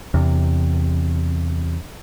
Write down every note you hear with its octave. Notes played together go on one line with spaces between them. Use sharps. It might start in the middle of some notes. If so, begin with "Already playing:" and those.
E2 C3